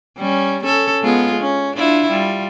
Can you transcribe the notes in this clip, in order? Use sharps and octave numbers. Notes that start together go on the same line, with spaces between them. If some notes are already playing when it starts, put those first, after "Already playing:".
G3 C#4
C#4 A4
G#3 B3 F4
C#4
D4 E4 F4
G3 F4